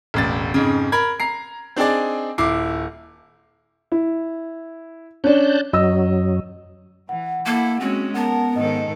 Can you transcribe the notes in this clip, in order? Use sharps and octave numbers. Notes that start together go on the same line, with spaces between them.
E1 A1 A6
F2 G#2 C#3
A#4 B5 G#6
A#5 C7
C4 D4 D#4 G#4 D5
D#1 E4 D6 C7
E4
C#4 D4 A5 F#6 G6
F#2 F#3 D#5 E6
E3 F#5
A#3 E4 A4
G#3 C4 C#4 F#4
B3 A#4 F#5 A5
G#2 D#3 A4 D#5